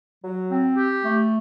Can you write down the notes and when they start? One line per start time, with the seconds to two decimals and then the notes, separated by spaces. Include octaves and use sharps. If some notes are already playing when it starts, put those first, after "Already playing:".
0.23 F#3
0.50 C4
0.77 G4
1.04 A3